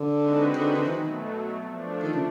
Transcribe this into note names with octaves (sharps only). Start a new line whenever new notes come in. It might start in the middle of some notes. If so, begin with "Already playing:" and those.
Already playing: D3
G#3 C4 D#4 F#4 B4
D3
D3
E3
B2 D#3 F#3 A3
F3 A3 D4
D#3
C#3